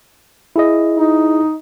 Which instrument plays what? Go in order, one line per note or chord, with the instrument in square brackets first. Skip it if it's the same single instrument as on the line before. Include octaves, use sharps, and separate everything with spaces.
[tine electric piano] E4 G#4 D#5
[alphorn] D#4